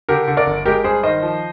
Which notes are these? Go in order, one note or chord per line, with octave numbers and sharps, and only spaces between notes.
D3 G4 A#4
D3
A#4 D5
G1
G#3 G4 A#4
G2 G#4 C5
D#3 C5 D#5
F3